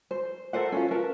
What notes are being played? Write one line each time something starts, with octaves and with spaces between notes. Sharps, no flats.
C5
A4 A#4 C5 F#5
C#4 F4
A#4 B4 A5